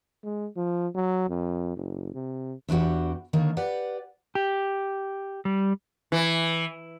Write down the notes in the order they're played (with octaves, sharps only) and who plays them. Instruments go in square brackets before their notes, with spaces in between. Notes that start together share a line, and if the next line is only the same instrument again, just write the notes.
[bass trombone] G#3
F3
F#3
F2
F#1
C3
[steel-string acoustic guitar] E2 D4 F#4 G4 F#5
D3 D#3 A#3 A#4 C#5
G4 B4 D5 F#5
[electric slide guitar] G4
G3
[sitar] E3